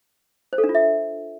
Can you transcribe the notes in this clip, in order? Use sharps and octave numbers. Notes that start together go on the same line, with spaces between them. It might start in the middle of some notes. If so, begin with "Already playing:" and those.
C5
A4
D4
F4
E5